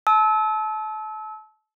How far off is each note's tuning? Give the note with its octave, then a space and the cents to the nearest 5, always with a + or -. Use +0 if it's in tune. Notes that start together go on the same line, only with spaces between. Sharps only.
A5 -30 E6 -30